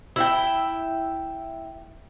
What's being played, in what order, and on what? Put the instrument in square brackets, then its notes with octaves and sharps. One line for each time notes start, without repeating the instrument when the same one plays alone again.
[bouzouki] E4 E5 G5